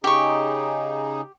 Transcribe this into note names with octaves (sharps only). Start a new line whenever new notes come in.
C#3 D#4 G4 G#4 C#6